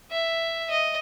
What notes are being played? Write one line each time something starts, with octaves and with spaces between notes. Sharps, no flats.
E5
D#5